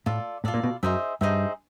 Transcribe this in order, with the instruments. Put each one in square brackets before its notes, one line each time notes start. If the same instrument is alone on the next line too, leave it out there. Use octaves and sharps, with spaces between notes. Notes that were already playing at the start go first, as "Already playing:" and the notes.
[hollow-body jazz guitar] A2 [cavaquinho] F4 A4 D5
[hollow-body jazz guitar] A2 [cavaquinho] F4 A4 D5
[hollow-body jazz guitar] A#2
B2
[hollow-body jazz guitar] F#2 [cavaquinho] D#4 G#4 C5 E5
[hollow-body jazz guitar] G2 [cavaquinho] D#4 G#4 C5 E5